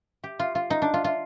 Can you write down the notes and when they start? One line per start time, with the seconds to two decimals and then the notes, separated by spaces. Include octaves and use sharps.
0.24 G4
0.39 F4
0.55 F4
0.70 D#4
0.82 D4
0.94 F4
1.04 F4